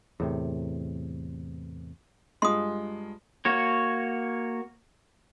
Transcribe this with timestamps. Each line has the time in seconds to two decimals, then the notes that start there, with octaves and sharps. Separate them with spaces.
0.20 E2 A2 C3
2.42 G2 G#3 F4 C6 D#6
3.45 A#3 F#4 C#5